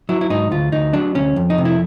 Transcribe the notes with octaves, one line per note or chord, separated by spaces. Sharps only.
F#3 E4
E4
G#2 D#4
D2 F4
D2 D#4
F#3 D4
D2 C#4
F2
D#4
C3
E4